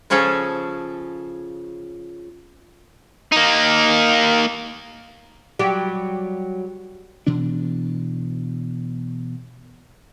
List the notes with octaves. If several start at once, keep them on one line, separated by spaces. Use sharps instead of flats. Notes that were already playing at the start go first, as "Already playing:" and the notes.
C#3 F3 C#4 G#4 A4
A#3 D#4
F#3 G3 G4
B2 E3 D4